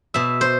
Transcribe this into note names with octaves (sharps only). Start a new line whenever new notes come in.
B2 E5
C5